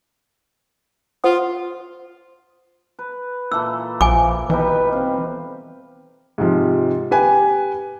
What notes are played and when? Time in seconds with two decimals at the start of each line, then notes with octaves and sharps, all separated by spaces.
1.24 F4 C5 F#5 D#6
2.99 B4
3.52 A#2 E3 A4 E6
4.01 A#1 F3 G#5 D6
4.50 B2 E3 G3 D#4 B4
4.93 C4 F5
6.38 G#2 C3 F3
7.11 G4 B4 G#5